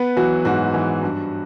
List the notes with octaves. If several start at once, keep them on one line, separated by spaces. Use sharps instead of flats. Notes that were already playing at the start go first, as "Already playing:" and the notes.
Already playing: B3 B4
E3 F#3 F#4
G#2 F#3 F#4
E3
G2